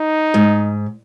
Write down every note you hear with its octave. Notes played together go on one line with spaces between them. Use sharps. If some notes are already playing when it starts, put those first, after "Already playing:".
Already playing: D#4
G#2